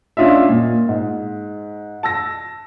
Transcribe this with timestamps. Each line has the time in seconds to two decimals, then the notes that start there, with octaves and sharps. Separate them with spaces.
0.17 C#4 D4 F4 D#5 E5
0.49 A#2
0.89 G#2
2.03 A5 E6 A#6